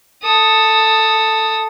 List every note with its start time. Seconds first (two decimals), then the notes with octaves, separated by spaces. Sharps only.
0.24 A4 D#6